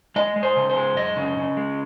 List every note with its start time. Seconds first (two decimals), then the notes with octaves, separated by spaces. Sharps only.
0.16 G#3 D#5
0.36 G#3
0.43 C5
0.56 C#3
0.70 C5
0.76 G#3
0.96 F#2 D#5
1.16 C#3
1.37 C#3
1.57 G#3